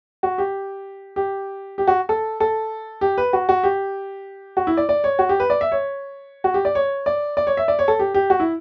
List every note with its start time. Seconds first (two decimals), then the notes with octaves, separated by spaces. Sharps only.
0.23 F#4
0.38 G4
1.16 G4
1.78 G4
1.87 F#4
2.09 A4
2.40 A4
3.01 G4
3.18 B4
3.33 F#4
3.49 F#4
3.63 G4
4.57 F#4
4.67 E4
4.77 D5
4.89 D5
5.04 C#5
5.19 F#4
5.29 G4
5.40 B4
5.50 D5
5.61 E5
5.72 C#5
6.44 F#4
6.54 G4
6.65 D5
6.75 C#5
7.06 D5
7.37 D5
7.47 C#5
7.57 E5
7.68 D5
7.79 C#5
7.88 A4
7.99 G4
8.14 G4
8.30 F#4
8.40 E4